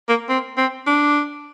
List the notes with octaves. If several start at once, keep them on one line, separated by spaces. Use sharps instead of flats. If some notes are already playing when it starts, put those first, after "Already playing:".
A#3
C4
C4
D4